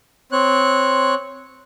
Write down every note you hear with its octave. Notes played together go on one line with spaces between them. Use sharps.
C4 C#5 F#6